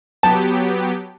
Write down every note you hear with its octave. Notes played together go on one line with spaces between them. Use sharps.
F#3 B3 G4 A5